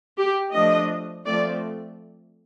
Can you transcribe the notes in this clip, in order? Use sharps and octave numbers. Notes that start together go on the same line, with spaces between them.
G4
F3 A3 D4 D#5
F3 A3 C4 D5